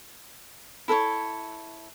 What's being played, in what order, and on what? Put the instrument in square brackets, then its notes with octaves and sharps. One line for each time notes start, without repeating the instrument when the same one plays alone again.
[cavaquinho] E4 A4 B4 C#5